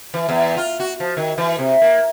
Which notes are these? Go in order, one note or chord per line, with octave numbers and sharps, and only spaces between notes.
E3
E2
F4
F#4
F3
D#3
E3
C3
A#3